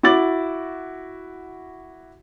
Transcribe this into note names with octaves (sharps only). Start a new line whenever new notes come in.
E4 F#4 D6 A6 F#7